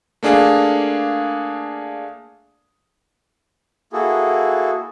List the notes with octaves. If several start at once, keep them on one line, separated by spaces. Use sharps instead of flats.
A3 A#3 D4 G#4 F5
A#3 E4 F#4 G#4 A4